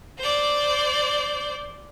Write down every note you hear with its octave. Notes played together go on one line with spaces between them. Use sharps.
C5 D5